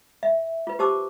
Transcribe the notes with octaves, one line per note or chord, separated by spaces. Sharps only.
E5
F4 B4
G4 C5 A5 D6 E6